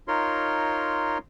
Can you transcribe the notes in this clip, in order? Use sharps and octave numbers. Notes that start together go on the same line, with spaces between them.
D#4 F4 A#4 C#5 C6